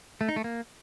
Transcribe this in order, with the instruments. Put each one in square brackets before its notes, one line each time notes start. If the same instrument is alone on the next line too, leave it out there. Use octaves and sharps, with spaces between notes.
[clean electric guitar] A3
D#4
A3
A#3